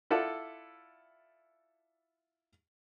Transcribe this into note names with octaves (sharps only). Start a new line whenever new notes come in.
E4 F4 A4 D5 F#5 A5